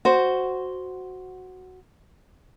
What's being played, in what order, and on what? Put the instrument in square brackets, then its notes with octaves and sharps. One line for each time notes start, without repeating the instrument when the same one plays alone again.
[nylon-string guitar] F#4 C5